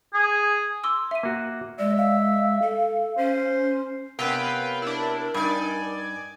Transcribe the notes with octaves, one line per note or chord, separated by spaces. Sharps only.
G#4
C6 D6 E6
E5 D#7
A#3 F#4
G#3 D5 E5
F5
A4
C#4 C5
C3 B3 C#4 A#4 B4 F5 G5
D4 E4
G2 D#4 D5 G#5